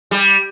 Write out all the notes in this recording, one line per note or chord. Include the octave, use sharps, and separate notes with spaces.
G3